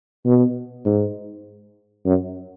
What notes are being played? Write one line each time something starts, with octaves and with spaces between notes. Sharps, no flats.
B2
G#2
F#2